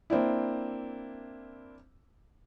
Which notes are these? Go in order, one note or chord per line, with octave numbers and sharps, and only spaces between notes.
A#3 C4 D4 E4